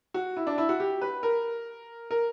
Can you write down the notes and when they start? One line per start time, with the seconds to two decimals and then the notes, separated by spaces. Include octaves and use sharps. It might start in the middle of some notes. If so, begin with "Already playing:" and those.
0.14 F#4
0.37 E4
0.47 D4
0.58 E4
0.69 F#4
0.80 G4
1.01 B4
1.23 A#4
2.11 A#4